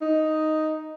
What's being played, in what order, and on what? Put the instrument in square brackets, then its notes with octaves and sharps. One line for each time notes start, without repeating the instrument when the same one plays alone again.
[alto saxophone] D#4